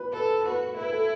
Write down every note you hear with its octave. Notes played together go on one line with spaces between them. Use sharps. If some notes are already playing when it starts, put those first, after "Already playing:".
Already playing: B4
A4 B4
F#4 B4
E4 B4
A4